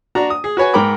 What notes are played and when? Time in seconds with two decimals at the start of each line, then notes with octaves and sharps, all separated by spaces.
0.15 D4 F#4 D5 A#5
0.30 D#6
0.44 G#4
0.57 F#4 B4 C#5 G#5
0.74 G#2 A#4 G5 A#5 B5 D6